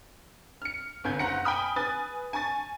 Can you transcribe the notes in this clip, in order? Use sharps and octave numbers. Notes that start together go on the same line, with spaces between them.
F6 C#7
G1 C2 G#5 G6
F#1 F#5 A#5 A#6 C#7
G5 G#5 B5 D#6 F6
B4 G#5 D#6 A6
G#5 A5 C#6 A6